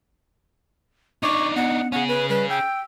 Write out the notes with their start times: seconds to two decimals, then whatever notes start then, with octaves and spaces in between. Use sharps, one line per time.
1.23 D4 D#4 C#6 D6
1.56 B3 F#5
1.92 C#4 G#4 F#5
2.09 B4
2.29 G3 B4
2.49 G5 E6